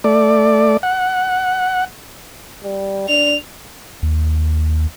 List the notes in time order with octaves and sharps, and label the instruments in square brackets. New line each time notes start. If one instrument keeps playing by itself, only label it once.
[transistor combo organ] A3 D5
F#5
[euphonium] G3
[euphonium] D4 [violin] F7
[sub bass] D#2